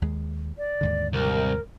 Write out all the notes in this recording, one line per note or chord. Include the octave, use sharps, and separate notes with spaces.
D#2 G#3
D5
D#2 G#2 D3
C2 A#4